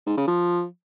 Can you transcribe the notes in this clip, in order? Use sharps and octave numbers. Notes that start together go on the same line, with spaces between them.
G#2
C#3
F3